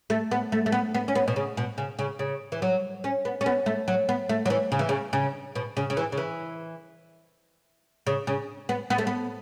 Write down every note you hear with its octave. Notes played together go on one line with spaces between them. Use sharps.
A3
B3
A3
A3
B3
B3
C#4
B3
B2
C#3
B2
C#3
C#3
C#3
E3
F#3
C#4
B3
C#4
B3
A3
F#3
B3
A3
F#3
E3
C#3
E3
C#3
C#3
B2
C#3
C#3
E3
C#3
E3
C#3
C#3
B3
B3
A3
B3